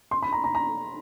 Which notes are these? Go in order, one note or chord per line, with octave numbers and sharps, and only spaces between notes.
C6
B5
A#5
A#5
A#5